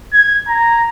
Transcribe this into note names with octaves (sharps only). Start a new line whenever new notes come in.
G#6
A#5